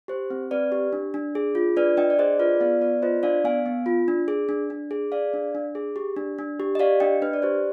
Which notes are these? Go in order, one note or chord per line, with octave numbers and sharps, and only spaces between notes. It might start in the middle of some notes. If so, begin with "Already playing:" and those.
G4 C5
C4
C4 B4 D5
G4
D4
D4
G#4
F4
D4 B4 D5
D4 D#5 G5
D5
G#4 C5 D#5
F4 B4 D5
B3 D5 F5
B3 B4 D5
F4 C5 D#5
D4 D5 F5
B3 F5 G#5
B3
F4
D4
G#4
D4
D4
G#4
G#4 D5 F5
D4
D4
G#4
G4
D4
D4
G4
D#5
G4 D5 F5
D4 D#5 G5
D4 B4
D5
G4 C5